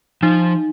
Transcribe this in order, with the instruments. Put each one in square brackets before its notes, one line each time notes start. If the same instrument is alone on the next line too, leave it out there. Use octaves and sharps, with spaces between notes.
[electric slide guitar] F3 [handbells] D#4